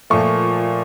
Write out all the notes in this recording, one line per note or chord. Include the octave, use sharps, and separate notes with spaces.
A#2 F3 A3 C#6